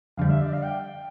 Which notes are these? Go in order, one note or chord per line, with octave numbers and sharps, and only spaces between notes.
F2 D3 G3 F5
E5
D5
F5
G5